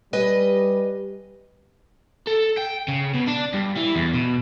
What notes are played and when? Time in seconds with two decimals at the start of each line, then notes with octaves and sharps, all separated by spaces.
0.13 G3 B4 D#5 G#5
2.27 A4
2.58 G5
2.88 C#3
3.14 B2
3.27 D4
3.54 G2
3.77 E3
3.96 E2
4.14 B2